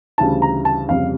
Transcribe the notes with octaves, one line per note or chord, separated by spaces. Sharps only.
D2 C#3 E3 G3 A5
A#5
A5
F1 F2 C#3 G3 F5